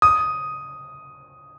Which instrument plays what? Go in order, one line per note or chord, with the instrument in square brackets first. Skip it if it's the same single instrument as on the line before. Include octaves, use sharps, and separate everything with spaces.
[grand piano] D#6